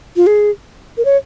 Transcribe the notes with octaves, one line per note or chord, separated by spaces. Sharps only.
F4
G#4
A#4
C#5